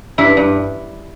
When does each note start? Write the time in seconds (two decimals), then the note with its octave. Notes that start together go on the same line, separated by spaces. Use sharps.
0.18 G2 E4
0.37 G2